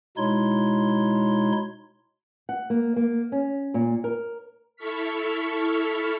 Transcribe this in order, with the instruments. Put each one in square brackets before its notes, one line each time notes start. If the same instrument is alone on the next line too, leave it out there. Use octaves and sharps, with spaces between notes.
[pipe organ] B2 G#3 D#4 E4 C#5 C6
[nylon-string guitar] F#5
A#3
A#3
C#4
A#2
A#4
[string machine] E4 A4 C#6 F6 B6